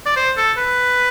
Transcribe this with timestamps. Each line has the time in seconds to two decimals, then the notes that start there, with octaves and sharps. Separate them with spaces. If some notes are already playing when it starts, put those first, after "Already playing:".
0.06 D5
0.16 C5
0.37 A4
0.58 B4